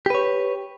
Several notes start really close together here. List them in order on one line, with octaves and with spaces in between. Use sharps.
G4 B4 C#5